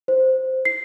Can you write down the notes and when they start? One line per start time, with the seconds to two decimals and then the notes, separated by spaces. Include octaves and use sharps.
0.08 C5
0.65 C7